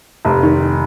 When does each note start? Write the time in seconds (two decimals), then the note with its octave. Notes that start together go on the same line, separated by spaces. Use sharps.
0.25 F1
0.43 D#3